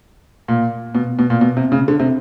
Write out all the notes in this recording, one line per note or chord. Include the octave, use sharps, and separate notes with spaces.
A#2
B2
B2
A#2
B2
C3
C#3
D3
C3